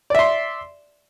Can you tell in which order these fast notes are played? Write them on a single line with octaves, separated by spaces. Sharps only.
D5 E5 C6